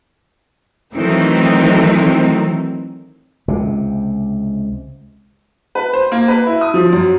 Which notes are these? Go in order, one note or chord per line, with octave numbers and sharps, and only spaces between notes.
D#3 E3 F#3 A3 C4 D#4
C#2 C3
B4
C5
A#3
B4
E4
D#6
F3
F#2